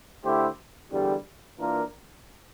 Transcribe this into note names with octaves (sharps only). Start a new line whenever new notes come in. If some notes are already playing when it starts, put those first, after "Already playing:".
D3 A3 E4 G4 C5
E2 D3 G3
E3 A#3 D4 F4 A#4